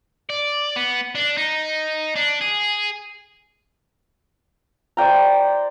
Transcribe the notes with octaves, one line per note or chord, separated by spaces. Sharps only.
D5
B3
D4
D#4
D4
G#4
C5 D5 G5 A#5